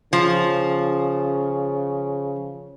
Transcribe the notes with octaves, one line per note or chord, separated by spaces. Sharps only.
C#3 F3